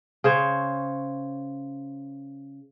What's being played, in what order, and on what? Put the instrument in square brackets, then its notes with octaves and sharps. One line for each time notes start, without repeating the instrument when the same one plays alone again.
[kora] C#3 C5 C#5